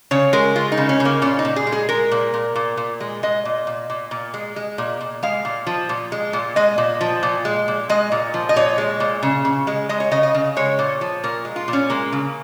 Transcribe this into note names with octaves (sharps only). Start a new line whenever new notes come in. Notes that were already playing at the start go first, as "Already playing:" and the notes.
C#3 C#5
G#3 A#4
G#3 F4
D#4
C#3
C#4
C#3
A#3
A#2 C#4
D#4
A#2
G#4
G#3
G#4
G#3 A#4
A#2
A#2
A#2
A#2
G#3
G#3 D#5
A#2
A#2
A#2
A#2
G#3
G#3
A#2
A#2
G#3 F5
A#2
F3
A#2
G#3
A#2
G#3 D#5
A#2
F3
A#2
G#3
A#2
G#3 D#5
A#2
F3
D#5
A#2 C#5
G#3
A#2
C#3
C#3
G#3
G#3 D#5
C#5
C#3 D#5
D#5
C#3
G#3 C#5
A#2
F3
A#2 A#4
G#3
F4
A#2
C#4
G#3 A#3
C#3